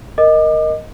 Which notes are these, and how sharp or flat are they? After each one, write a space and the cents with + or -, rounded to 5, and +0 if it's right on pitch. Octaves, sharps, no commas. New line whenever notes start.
A#4 +0 D#5 +0 D6 +30